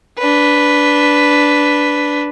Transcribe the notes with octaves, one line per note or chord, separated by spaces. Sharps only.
D4 B4